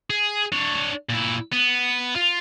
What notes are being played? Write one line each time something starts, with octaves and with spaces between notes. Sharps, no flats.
G#4
D4 C#5
A#2 E4
B3
F4